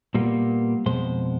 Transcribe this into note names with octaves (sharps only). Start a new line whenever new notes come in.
A#2 G3 A#3 B3
F2 B2 G#3 C5